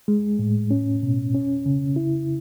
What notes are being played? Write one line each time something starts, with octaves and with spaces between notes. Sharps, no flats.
G#3
A2
C#4
B2
C#4
C#3
E4